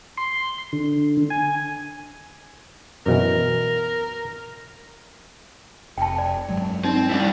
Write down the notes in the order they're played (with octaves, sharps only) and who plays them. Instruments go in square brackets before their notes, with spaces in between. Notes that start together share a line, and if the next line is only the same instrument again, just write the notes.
[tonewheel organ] C6
D3
G#5
[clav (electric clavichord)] F#2 B2 E3 [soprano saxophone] A#4
[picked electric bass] F1 [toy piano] G5 A5
[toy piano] D5
[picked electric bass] G2 F#3 G#3
[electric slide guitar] C4 [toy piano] D#4
[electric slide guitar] G3 D4 E4